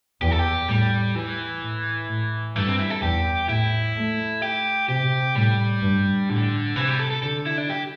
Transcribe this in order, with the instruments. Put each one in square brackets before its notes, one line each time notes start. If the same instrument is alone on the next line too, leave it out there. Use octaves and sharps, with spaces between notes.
[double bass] E2 [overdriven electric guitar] G4
[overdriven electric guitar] A4
G4
[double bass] A2 [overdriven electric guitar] G3
[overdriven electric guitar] E3
[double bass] A2
A2
[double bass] G2 [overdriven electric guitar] A3
[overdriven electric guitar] C4
E4
A4
[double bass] E2 [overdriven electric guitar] G4
[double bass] A2 [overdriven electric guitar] E4
[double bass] A3
[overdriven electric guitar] G4
[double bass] C3 [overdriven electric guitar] G4
[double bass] A2 [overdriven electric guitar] G3
[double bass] G2
[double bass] A2 [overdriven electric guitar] D3
[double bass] C3 [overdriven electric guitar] E3
[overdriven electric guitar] G3
A4
A4
[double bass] D3 [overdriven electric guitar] A4
[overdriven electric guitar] E4
D4
G4